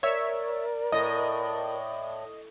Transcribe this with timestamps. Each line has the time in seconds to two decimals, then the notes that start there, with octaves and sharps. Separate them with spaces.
0.03 A#4 C#5 D5 E5
0.92 A2 D#5